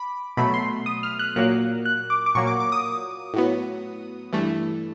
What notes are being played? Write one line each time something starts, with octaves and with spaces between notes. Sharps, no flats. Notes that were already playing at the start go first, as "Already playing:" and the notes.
Already playing: B5 D6
B2 F#3 A3 B5
C6
D#6
F6
F#6
A#2 F#3 A#3 F#6
F#6
D6
D6
A#2 F#3 A#3 C#6
D6
D6
D#6
A2 F#3 B3
G2 E3 A3